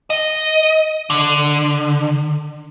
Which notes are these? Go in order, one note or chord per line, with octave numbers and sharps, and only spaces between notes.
D#5
D3